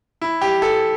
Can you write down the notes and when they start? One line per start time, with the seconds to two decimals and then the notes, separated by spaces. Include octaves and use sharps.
0.22 E4
0.41 G4
0.62 A4